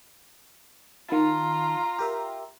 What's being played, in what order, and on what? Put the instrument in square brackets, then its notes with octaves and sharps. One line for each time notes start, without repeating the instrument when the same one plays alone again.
[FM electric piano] D#3 A5 [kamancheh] F4 A#5
[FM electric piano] G4 A#4 E5